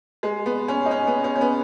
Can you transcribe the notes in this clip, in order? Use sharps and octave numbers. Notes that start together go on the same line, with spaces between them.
G#3
B3
C#4
D#4
C#4
B3
C#4
C#4
B3